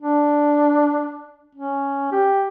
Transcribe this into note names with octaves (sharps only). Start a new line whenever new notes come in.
D4
C#4
G4